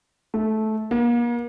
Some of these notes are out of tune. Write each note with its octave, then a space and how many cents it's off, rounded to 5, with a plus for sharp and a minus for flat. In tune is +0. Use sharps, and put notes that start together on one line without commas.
A3 -15
A#3 +40